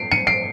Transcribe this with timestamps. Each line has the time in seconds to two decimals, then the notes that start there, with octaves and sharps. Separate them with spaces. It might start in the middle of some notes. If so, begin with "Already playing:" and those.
Already playing: C7 D7
0.12 C#7 D#7
0.27 C7 D7